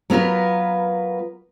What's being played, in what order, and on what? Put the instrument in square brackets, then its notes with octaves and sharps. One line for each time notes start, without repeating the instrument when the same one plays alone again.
[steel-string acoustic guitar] F#3 B3 F4 A#4 B4